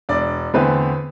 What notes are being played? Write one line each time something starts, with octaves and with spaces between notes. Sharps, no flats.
E1 D4 D5
E2 D3 A3 B3 C4 B4